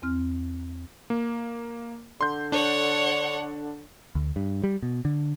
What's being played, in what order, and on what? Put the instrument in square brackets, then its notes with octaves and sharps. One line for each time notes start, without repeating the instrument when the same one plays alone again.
[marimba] E2 C4 F6
[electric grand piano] A#3
[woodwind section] D3 [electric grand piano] C6 G6
[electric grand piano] D4 [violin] C#5 F#5
[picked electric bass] D2
G2
G3
B2
D3